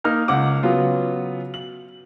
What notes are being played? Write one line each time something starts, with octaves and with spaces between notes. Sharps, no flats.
A#3 D#4 F6
C#2 F#5 D6
C#3 F#3 B3 F4
F#7